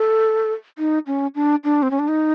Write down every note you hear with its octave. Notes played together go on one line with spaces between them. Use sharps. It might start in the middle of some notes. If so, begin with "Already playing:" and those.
Already playing: A4
D#4
C#4
D4
D4
C4
C#4
D4
D#4